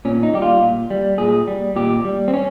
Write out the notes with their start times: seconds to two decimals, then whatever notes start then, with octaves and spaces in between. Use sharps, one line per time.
0.05 A#2 C#4
0.23 D#4
0.34 G3 G4
0.42 F4
0.61 A#2
0.90 G3
1.18 A#2 G#4
1.47 G3
1.76 A#2 G4
2.05 G3
2.28 C4
2.34 C#4